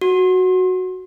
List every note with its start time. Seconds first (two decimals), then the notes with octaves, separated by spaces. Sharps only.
0.01 F#4